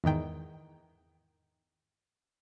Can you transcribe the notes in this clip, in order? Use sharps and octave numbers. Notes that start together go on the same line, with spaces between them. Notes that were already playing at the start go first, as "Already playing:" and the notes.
E2 G#2 D#3 G5